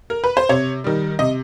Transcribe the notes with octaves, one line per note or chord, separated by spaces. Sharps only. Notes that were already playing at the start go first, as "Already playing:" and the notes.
A#4
B4
C5
C3 C#5
D#3 G3
C3 D#5